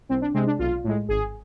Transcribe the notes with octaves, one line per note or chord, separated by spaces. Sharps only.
C2 C4
D4
C3 G#3 C4
D4
B1 F4
A2 G#3
G#1 G#4